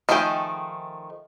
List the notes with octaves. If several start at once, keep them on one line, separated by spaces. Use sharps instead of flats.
D#3 F3 A3 G#4 G5